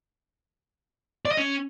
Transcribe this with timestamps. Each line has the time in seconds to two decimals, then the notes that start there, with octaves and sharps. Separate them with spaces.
1.25 D5
1.31 D#5
1.38 C#4